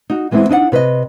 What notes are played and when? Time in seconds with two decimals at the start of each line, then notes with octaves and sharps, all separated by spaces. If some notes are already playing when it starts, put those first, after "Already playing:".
0.10 D#4 F#4
0.31 E3 G#3 B3 C4 E4
0.49 D4 D#4 D#5 F#5
0.72 C3 B4 C5 D#5